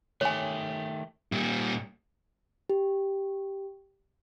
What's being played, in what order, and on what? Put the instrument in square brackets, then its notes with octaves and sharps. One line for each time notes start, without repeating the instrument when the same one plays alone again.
[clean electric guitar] D#3 A3 G4 [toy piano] C#5 G#5
[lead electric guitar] A#2 G3
[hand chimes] G4